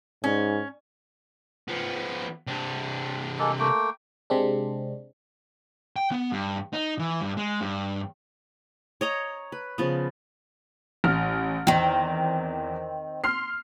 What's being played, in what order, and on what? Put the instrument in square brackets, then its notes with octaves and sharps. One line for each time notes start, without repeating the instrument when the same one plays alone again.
[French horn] G#2 [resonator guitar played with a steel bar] C#4
[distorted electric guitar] F3 B3
C3 D4
[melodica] G#3 A#3 A4
A3 A#3 G5
[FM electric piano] C3 G#3 C4 D4
[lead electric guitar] G5
B3
G2
D#4
E3
G2
G#3
G2
[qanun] C#5 D#5 A#5
B4
C#3 F3 B3
[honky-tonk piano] A1 F6
[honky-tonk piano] E2 [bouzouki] D#3 C4
[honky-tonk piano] C6 F6 C7